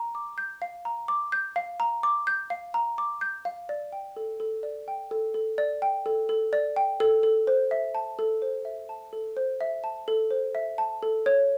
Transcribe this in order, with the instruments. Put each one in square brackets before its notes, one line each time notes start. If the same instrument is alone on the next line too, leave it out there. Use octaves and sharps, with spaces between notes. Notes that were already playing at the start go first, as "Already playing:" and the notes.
Already playing: [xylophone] A#5
D6
G6
F5
A#5
D6
G6
F5
A#5
D6
G6
F5
A#5
D6
G6
F5
D5
G5
A4
A4
D5
G5
A4
A4
D5
G5
A4
A4
D5
G5
A4
A4
C5
E5
A5
A4
C5
E5
A5
A4
C5
E5
A5
A4
C5
E5
A5
A4
C#5